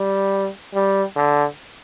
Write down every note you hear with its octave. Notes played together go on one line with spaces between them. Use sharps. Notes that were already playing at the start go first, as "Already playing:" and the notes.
Already playing: G3
G3
D3